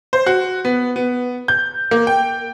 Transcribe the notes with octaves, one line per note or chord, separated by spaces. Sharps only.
C5
F#4
B3
B3
G6
A#3
G5